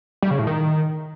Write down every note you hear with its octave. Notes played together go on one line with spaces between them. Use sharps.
G3
C#3
A2
D#3